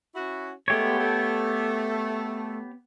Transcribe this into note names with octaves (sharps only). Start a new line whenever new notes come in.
C#4 E4 F#4
G#3 A3 B3 G4 C#5
A3